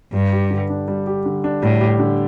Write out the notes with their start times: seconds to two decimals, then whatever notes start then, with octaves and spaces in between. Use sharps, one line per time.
0.13 G2 G3
0.32 G4
0.50 D3
0.70 D4
0.88 G3
1.07 G4
1.26 D3
1.44 D4
1.63 A2 G3
1.81 G4
2.00 D3